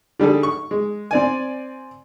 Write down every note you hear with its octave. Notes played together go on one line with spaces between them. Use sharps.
D3 G3 G#4 A4
C#6
G#3
C4 D5 G#5